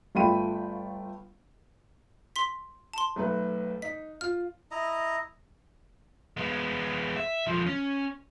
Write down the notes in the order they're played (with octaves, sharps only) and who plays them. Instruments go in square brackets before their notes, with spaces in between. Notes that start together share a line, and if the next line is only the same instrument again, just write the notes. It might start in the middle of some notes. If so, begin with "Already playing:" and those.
[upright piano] G1 A3 F4 G5 B5 D#7
[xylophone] C6 B6
A5 C6
[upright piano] B1 A3 B4
[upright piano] D#4 [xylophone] B6
[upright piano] F4 [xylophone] F6
[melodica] E4 D#5 A#5
[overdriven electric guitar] G#3 B3
E5
D3 F3
C#4